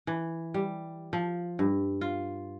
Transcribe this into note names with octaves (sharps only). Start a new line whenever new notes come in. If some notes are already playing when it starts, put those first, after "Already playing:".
E3
G3
F3
G2
F4